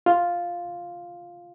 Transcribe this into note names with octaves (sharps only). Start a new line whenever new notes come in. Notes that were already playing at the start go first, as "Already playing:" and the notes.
F4